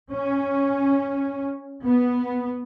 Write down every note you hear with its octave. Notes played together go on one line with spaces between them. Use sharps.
C#4
B3